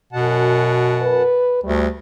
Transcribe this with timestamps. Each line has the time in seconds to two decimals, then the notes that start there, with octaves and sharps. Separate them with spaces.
0.13 F#2 B2 F#5 A5
1.01 B4
1.64 D2 G3 A3